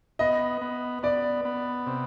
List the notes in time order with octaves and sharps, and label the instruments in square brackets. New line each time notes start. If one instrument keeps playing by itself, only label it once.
[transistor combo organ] B3 [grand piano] D#5
[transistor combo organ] B3
[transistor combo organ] B3 [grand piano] D5
[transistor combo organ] B3
C3